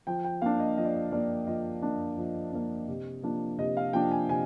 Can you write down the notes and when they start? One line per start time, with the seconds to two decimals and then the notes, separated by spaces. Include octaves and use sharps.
0.07 F3 G5
0.25 G5
0.42 A#3 D4 F5
0.60 D#5
0.77 F3 D#5
0.85 D5
0.94 D#5
1.12 A#3 D4 D5
1.47 F3 D#5
1.82 A#3 D4
2.18 F3
2.53 A#3 D4
2.88 C3
3.23 F3 A#3 D4
3.58 C3 D#5
3.77 F5
3.93 F3 A#3 D4 G5
4.11 G#5
4.28 C3 G#5